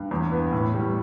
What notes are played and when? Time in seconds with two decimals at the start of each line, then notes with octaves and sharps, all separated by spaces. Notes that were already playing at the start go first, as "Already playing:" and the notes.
Already playing: G2
0.11 E2
0.32 B3
0.52 A2
0.74 G3